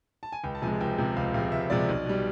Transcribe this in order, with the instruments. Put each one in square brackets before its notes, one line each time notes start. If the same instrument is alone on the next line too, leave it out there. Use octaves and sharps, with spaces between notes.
[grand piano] A5
G#5
C#2 G5
A5
C3 F3 G#3 G#5
C#2 G5
C3 F3 G#3
C#2 F5
C3 F3 G#3 F5
C#2 E5
C3 F3 G#3 D5
B1
B2 G3